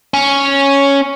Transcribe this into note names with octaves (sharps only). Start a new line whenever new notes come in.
C#4